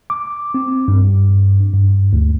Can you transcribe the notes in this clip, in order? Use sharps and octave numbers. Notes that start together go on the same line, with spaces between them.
D6
C4
G2
G2
D2